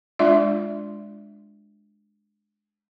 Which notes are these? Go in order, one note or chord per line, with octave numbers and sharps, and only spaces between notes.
G#3 D4 F4 D5 E5